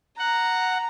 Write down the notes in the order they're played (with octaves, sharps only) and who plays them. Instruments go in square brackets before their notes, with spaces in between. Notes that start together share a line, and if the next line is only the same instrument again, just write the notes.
[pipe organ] F#5 [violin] A#5